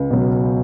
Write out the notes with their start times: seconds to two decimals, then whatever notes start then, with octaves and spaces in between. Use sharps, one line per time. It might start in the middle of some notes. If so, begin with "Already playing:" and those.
Already playing: C#2
0.10 B2 F#3